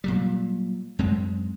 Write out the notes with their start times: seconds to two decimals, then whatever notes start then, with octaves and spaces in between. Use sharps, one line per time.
0.04 A#2 F#3 G3
0.99 F#2 G#3 C4